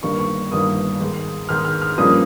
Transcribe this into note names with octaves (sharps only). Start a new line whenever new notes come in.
G1 G2 D#3 A#3 C#6
C#6
G1 G2 D#3 A#3 D#6
G#2 D#3 G#3
G#2 D#3 G#3 F6
F6
F6
G2 F3 A#3 C#4 D#6